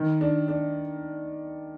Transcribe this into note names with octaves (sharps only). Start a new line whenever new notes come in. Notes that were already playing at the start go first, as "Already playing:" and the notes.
Already playing: D#3
D4
D4